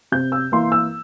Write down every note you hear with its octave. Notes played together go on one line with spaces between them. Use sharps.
C3 G6
E6
E3 A#3 E4 C6
E6